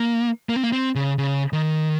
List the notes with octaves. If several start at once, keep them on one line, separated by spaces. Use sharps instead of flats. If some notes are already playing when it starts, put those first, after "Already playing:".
Already playing: A#3
A#3
C4
A#3
C4
C#3
C#3
D#3